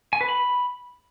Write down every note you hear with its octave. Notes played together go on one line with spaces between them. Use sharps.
G#5
B4
B5